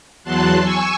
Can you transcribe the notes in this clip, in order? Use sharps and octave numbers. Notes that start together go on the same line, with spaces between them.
E2 F#3 A5 C6 F#6
G#5 C#6 E6